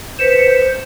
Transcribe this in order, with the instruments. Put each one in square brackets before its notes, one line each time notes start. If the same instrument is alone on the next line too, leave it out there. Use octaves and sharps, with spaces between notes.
[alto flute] B4 [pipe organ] C5 [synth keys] B6 C#7 E7